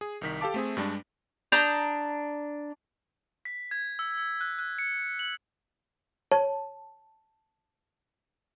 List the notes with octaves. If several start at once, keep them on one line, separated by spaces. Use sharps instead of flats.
G#4
C2 D#3 B6
G4 A4 F5 A5 D6
A3 C4 G#4
G2 G3 G#3 D4
D4 A#5 D#6 G6
B6
G#6
E6
E6
F#6
F#6
C#7
F#7
C#5 A5